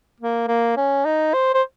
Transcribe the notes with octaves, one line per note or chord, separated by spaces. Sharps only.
A#3
A#3
C#4
D#4
C5
C5